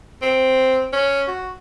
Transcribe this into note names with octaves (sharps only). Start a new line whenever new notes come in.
C4
C#4
F#4